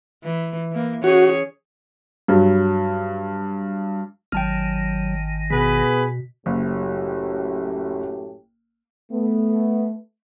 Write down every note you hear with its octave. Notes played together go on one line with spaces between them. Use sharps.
E3
E3 A#3
C#4 F#4 G#4 C#5
G2 F#3
G#1 D#3 F#3 G5 A5 F6
B2 B3 G#4 B4 B6
F#1 F#2 A2 G4
A3 B3